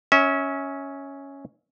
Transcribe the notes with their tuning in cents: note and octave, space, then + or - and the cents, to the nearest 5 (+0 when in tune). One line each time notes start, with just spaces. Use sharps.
C#4 +0 E5 -35